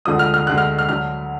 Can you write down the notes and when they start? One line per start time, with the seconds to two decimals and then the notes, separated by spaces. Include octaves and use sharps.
0.05 D2 D3 F3 G#3 D#6
0.19 F6
0.34 F6
0.47 D2 D3 G#3 F#6
0.58 F6
0.79 F6
0.89 D2 D3 F#3 F6